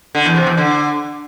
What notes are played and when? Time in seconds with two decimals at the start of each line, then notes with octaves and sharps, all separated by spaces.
0.15 D3
0.25 E2
0.36 C3
0.47 E2
0.57 D3